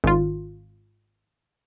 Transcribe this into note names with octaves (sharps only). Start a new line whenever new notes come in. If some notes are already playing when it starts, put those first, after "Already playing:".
G#1 F4